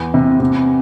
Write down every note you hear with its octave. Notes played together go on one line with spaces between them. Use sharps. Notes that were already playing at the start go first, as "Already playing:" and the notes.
Already playing: E2
C3
C3